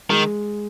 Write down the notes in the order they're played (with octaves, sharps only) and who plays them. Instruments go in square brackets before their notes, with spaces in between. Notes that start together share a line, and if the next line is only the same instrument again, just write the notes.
[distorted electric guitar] D#3 [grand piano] G#3